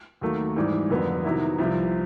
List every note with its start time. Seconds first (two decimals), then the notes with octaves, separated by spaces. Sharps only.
0.21 D#2 D#3 F#3 A3
0.56 G#2 E3 G3
0.90 F2 D3 F#3 B3
1.24 C3 D#3 F#3 B3 E4
1.58 C2 C3 F3